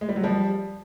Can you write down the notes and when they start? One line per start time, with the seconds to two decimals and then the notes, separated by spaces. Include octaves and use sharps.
0.01 G#3
0.09 G3
0.16 F#3
0.24 F3 G3